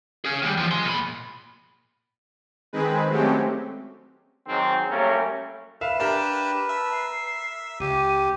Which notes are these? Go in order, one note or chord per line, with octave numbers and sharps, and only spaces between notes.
C#4 G#4
D#2 G3
E3 F3
G#4 C6
A#2 B5
D#3 G#3 C4 G#4 B4
F#3 G#3 A3 C4 C#4 G4
G#2 D#3 F#3 G#3 C4 D#4
F#3 G3 A3 A#3 C#4
B4 E5 F5 E7
D4 G4 A#4 D5
E5 A5
C7
C#2 G4 D#7